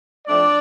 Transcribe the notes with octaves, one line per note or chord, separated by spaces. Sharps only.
F3 A3 C4 D4 D5